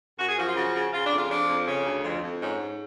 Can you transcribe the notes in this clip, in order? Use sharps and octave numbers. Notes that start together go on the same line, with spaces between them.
F#2 F#4
G#4
F3 F#4
F4
C#3 F#4
C#3
C#3 F4
D4
F2
F4
F3 D4
F2
C#3 C#4
D2
F2
F2
G#2 C#4
G#2